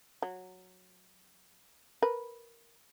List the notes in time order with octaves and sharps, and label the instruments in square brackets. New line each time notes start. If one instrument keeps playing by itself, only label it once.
[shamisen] F#3
A#4 B4